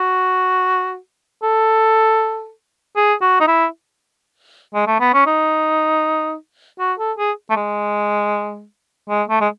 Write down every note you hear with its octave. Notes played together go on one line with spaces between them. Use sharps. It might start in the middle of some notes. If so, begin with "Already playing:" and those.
Already playing: F#4
A4
G#4
F#4
D#4
E4
G#3
A3
B3
C#4
D#4
F#4
A4
G#4
A3
G#3
G#3
A3
G#3